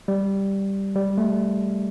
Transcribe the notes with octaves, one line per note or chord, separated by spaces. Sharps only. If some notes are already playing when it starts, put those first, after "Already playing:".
G3
G3
A3